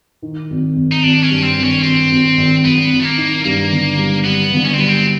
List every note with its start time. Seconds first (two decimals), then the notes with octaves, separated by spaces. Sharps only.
0.22 D#3
0.50 G#1
0.76 G#1
0.92 D#4
1.03 G#1 D4
1.24 C#4
1.30 G2
1.43 C4
1.57 G#1
1.63 C#4
1.83 G#1 C4
2.11 G#1
2.37 G#1
2.64 G#1 B3
2.91 G#1
3.00 A3
3.04 A#3
3.17 D#3
3.44 G2 A#3
3.71 G1
3.98 G3
4.25 G2 B3
4.52 G1
4.65 C#4
4.73 C4
4.78 G3 B3
4.88 C4